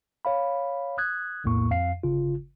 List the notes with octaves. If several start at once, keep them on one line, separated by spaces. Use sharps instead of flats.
C#5 F5 B5
D#6 F#6 G#6
B1 E2 A2 A#3 C#6
F2 F5 C7
G1 C#3 F4